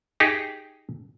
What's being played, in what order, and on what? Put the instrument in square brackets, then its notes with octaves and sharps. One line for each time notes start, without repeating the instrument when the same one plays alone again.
[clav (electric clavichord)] D#4 G4 G#4